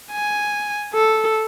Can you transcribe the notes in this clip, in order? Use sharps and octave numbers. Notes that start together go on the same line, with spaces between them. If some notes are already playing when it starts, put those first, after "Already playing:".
G#5
A4